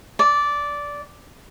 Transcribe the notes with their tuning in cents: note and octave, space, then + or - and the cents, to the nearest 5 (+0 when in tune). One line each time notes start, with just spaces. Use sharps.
D5 -10